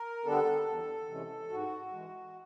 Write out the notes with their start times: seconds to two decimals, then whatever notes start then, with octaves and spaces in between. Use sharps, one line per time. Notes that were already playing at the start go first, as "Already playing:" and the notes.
Already playing: A#4
0.25 D3 G3 B3 D4 A4
0.66 E2
1.08 C3 E3 G#3 C#4
1.49 G#2 F#4
1.92 E3 G#3